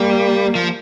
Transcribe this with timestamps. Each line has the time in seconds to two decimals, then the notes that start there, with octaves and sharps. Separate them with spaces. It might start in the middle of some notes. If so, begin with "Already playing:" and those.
Already playing: G3 A#3
0.55 F3